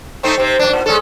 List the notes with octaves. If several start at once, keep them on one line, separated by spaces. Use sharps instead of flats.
A3 C4 D#4
C3 C4
F#2 D4
A#2
G#3 C#4 A4